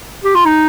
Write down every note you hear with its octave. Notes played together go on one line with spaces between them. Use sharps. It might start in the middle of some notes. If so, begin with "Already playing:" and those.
G4
F4
D#4